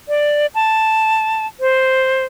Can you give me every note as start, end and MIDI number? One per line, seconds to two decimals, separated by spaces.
0.08 0.46 74
0.55 1.47 81
1.60 2.25 72